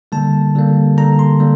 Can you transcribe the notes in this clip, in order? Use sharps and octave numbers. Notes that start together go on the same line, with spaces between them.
D3 G3 A#3 A5
D3 G3 A#3
D3 G3 A#3 A#5
C6
D3 G3 A#3